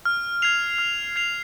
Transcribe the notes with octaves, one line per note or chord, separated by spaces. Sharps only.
F6
G#6 C7 F7
F6
G#6 C7 F7